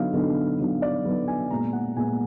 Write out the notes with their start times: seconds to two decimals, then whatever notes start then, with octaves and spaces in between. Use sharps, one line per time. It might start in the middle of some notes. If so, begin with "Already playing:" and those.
Already playing: D3 F#3 B3 D#4 F5
0.14 D3 F#3 B3 D#4
0.59 D3 F#3 B3 D#4
0.82 D5
1.05 D3 F#3 B3 D#4 B4
1.28 G#5
1.50 A#2 G#3 B3 A#5
1.73 F#5
1.96 A#2 G#3 B3 G#5